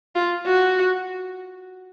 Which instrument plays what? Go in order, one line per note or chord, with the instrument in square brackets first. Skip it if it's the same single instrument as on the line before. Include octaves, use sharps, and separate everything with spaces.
[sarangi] F4
F#4